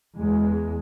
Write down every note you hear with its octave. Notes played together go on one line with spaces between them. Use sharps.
E2 G#3